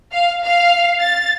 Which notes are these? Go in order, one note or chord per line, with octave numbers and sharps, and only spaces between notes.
F5
F5
A6